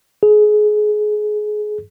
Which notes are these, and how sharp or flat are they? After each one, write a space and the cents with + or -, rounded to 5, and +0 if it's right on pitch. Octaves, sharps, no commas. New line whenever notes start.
G#4 +25